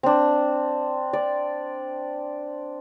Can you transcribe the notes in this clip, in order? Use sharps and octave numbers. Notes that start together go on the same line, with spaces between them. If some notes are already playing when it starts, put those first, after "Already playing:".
C4 D4
D5